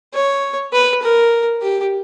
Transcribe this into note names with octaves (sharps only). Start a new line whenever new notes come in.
C#5
B4
A#4
G4